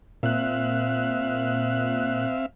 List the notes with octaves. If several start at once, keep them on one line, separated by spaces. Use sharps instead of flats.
A#2 C4 E5 F5 F#6